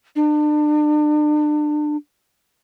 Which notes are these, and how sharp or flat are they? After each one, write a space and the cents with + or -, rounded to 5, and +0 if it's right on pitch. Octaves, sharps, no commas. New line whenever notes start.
D4 +35